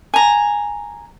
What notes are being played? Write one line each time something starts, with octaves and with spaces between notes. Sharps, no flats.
G#5 A#5